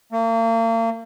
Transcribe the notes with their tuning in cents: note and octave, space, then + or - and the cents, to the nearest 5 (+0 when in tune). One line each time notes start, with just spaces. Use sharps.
A#3 -40